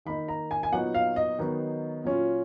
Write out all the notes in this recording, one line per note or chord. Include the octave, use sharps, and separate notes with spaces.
D#3 A#3 D#4 B5
A#5
G#5
G#5
A#2 F#3 B3 D#4 F#5
F5
D#5
D#3 F#3 B3 D#4
A#2 F#3 C#4 F4